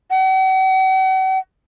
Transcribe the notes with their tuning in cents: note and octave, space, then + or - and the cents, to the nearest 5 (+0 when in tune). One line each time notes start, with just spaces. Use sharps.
F#5 +45